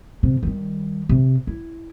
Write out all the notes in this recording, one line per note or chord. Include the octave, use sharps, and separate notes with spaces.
C3
D#3 G3
C3
E4